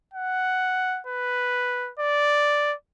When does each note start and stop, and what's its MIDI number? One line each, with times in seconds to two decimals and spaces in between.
0.14 1.01 78
1.07 1.91 71
1.99 2.74 74